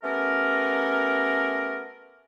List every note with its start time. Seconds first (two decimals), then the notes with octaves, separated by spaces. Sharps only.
0.03 A3 B3 C#4 G4 A#4